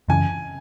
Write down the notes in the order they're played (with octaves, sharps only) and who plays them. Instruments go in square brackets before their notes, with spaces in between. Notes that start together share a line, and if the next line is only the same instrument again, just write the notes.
[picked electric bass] F#2 C#3 E3 [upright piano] G#5